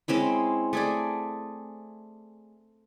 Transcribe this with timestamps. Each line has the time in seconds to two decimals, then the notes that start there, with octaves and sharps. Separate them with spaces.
0.08 G#3 C4 C#4 E4
0.73 A3 G#4 D5